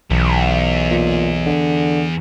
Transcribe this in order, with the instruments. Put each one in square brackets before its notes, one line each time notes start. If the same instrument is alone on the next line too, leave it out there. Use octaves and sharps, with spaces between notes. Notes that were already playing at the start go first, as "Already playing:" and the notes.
[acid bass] B1 [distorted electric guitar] E2
[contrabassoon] A#2
D3